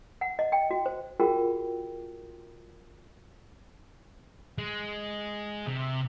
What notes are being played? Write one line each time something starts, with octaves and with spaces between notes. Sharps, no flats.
F#5
D#5
G5
F#4
C5
F4 F#4 G#4 A#4 F#5 G5
G#3
C3